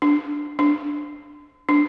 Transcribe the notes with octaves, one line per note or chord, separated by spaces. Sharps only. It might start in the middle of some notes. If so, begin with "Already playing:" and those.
D4
D4
D4